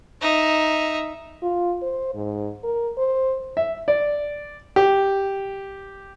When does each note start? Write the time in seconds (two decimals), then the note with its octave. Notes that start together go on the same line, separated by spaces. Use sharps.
0.22 D#4 E5
1.42 F4
1.82 C5
2.14 G#2
2.63 A#4
2.97 C5
3.57 E5
3.88 D5
4.76 G4